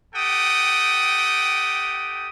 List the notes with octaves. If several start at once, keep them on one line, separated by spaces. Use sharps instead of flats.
G4 A4 F#5 G5 D#6